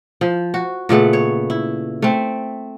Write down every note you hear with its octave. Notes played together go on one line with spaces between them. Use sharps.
F3
F#4
A#2 C#3 A3 B3
C#5
E4
A3 C4